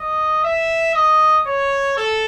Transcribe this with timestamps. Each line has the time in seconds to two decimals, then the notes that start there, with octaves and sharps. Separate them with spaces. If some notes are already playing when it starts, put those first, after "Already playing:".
Already playing: D#5
0.44 E5
0.95 D#5
1.47 C#5
1.97 A4